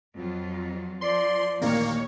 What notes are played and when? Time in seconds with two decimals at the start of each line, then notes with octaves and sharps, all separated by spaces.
0.17 F2 F#3 F4
1.01 F3 D5 C6
1.62 A1 D#2 A#2 D#3 A#3 C#5